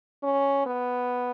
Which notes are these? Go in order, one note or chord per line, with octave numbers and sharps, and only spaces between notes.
C#4
B3